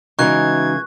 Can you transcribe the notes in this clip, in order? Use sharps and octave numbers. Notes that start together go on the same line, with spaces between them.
C#3 E3 G#3 D#4 F#4 C#6 F#6 G#6